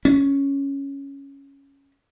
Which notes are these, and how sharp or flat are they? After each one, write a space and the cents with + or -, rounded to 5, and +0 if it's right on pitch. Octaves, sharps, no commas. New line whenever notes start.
C#4 +0